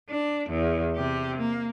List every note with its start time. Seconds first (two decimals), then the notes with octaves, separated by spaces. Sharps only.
0.10 D4
0.50 E2
0.95 C3 G4
1.37 A#3